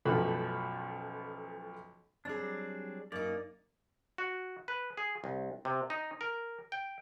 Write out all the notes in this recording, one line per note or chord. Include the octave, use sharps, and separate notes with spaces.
B1 F#2 F3 A3 F#4 B5
F#3 G3 C4 D4 G#4
F#2 A#3 D#4 D5
F#4
B4
G#4
C2
C3
D#4
A#4
G5